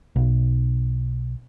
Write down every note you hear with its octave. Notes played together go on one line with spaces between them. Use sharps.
B1